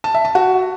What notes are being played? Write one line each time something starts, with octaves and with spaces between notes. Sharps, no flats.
A5
E5
A5
F#4